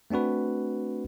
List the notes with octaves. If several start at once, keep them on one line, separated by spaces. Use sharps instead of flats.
A3 C4 D4 F#4 B4